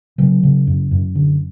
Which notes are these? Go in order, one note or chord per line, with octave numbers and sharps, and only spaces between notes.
C#3 F#3
C#3
F#2
F#2
D3